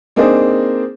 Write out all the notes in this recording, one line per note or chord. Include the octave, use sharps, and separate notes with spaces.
A#3 C4 D4 D#4 G#4 C5